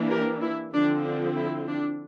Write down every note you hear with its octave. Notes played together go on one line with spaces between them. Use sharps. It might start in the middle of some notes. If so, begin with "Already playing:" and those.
Already playing: E3 A#3 D4
G4 A#4
E4
D3 F3 C4 D4
D4
E4
D4